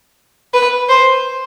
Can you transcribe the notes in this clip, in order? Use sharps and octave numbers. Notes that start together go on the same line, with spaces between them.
B4
C5